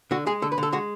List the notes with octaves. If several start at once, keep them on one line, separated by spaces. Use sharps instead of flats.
D3 F#4
G#3 G#4
D3 A4
B4
D3
A4
G#3 F#4